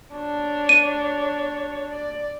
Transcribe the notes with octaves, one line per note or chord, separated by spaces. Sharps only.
D4 C#5
D#7
D5